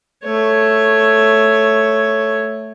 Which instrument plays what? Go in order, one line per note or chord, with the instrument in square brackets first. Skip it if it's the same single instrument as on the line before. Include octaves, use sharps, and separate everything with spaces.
[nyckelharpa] A3 C#5